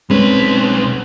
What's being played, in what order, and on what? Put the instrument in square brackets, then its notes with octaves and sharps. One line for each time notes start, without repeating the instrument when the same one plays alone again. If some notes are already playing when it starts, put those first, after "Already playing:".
[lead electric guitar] B1 B4 [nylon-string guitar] G#3 C4 C#4